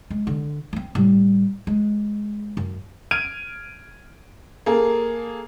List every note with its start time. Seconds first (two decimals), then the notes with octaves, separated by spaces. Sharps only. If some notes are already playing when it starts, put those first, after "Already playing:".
0.10 G#3
0.27 D3
0.73 B3 C4
0.95 A2 G3
1.67 G#3
2.57 F#2
3.11 F6 G#6 D7 D#7
4.66 A#3 G#4 A4